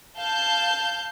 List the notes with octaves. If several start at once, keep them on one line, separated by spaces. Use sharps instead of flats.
F5 A5 G6